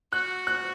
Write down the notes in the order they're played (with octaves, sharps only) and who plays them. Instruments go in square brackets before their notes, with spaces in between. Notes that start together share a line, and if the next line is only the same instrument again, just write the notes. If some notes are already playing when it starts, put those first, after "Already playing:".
[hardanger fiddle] F#4 [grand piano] F#6
[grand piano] F#6